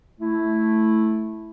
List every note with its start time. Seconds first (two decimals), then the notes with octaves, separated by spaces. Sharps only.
0.20 A3 E4